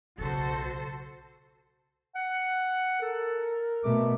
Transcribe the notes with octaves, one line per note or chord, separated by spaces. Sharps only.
B1 C#3 F#4 A4 C5
F#5
A4 A#4
B2 A3 D6